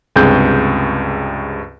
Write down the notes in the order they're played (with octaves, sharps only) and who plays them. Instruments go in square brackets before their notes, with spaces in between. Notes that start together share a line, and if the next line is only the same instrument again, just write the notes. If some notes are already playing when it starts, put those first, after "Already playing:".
[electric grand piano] C#2 G2 C3 G#4 G6